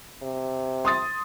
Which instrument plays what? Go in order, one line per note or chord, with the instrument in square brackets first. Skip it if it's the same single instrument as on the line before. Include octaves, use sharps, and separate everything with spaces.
[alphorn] C3
[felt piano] C6 D#6 A6